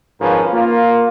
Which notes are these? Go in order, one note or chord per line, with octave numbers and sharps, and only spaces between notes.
G#1 G#2 F3 C#4 A#4 B4
A#3 F4